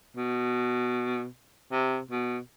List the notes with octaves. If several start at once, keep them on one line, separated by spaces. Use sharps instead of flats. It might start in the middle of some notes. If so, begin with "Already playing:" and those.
B2
C3
B2